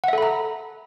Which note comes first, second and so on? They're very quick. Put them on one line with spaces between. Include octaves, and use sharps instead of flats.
F#5 E5 A4 B5 A#5